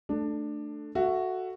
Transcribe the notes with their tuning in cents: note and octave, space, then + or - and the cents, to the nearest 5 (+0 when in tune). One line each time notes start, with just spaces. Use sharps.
A3 +0 D4 +15
F#4 +0 A4 +0 E5 +25